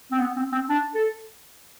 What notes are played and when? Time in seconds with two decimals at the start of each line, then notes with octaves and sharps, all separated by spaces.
0.11 C4
0.19 B3
0.36 C4
0.52 C4
0.69 D4
0.95 A4